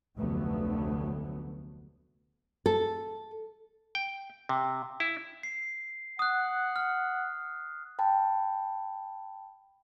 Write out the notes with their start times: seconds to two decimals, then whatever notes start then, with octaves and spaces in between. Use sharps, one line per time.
0.17 F1 D2 D3 F#3 A3 B3
2.66 A4
3.95 G5
4.49 C3
5.00 E4
5.43 C7
6.19 F#5 D#6 F#6
6.76 F6
7.99 G5 A5 B5